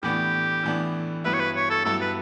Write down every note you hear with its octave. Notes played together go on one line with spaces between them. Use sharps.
A2 E3 B3 D4 G4
A2 E3 B3 D4
G2 F#3 B3 E4 B4
C#5
B4
C#5
A4
G2 F#3 B3 E4 A4
B4